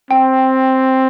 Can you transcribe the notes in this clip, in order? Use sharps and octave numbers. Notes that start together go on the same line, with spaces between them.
C4 G5